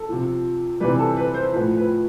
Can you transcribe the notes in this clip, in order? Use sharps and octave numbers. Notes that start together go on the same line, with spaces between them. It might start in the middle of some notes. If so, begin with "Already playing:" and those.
Already playing: A4
C3 F3
C3 E3 G3 B4
A4
B4
C5
A2 F3 B4
B4